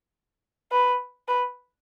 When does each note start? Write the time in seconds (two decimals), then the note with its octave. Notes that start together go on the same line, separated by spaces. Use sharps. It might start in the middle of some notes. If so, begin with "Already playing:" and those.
0.72 B4
1.28 B4